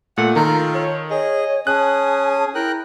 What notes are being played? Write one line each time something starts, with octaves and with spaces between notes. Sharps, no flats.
A#2 A3 F#5
D#3 F4 A4 A#4
C#5
G#4 C#5 D#5
C#4 G#4 A5 D#6 F#6
E4 A#4 G5 F#6